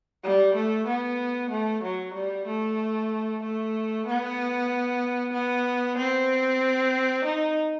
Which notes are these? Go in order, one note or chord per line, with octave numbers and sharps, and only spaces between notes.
G3
A3
B3
A3
F#3
G3
A3
A3
B3
B3
C4
D#4